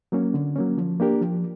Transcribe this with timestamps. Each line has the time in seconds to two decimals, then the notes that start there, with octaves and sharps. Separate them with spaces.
0.12 F#3 A#3 C#4
0.34 D3
0.56 F#3 A#3 C#4
0.78 F3
1.00 A#3 D4 G4 A#4
1.21 F3